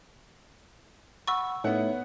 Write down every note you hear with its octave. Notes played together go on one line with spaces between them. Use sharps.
F#5 B5 C#6 E6
A2 B3 D#4 C#5 E5 F#5